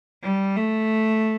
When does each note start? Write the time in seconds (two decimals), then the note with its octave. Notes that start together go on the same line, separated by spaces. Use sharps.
0.24 G3
0.57 A3